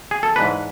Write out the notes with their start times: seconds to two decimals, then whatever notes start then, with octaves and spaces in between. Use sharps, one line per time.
0.11 G#4
0.23 A4
0.36 G#2 E3 G#3 D4 B4